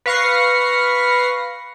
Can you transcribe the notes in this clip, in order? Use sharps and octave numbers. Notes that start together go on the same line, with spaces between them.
B4 F5 C#6 A#6 C7